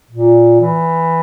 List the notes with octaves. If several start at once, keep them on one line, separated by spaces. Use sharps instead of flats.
A#2
E3